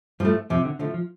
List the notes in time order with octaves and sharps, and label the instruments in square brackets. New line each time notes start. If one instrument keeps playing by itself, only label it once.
[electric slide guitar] G2 G3 [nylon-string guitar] F3
[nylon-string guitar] A3
[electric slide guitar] F2 F3 [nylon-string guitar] C3
[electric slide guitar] D3
[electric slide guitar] D3 [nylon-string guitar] F3 A3
[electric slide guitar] F3